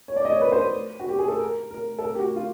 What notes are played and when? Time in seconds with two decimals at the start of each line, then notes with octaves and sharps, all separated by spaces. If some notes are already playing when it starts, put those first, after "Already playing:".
0.08 C#5
0.16 D5
0.25 D#5
0.33 C#5
0.41 B4
0.52 C5
0.58 B4
1.00 F#4
1.09 G4
1.19 G#4
1.28 A4
1.39 A#4
1.71 A#4
1.99 A4
2.04 A#4
2.15 G4
2.19 F#4
2.36 F4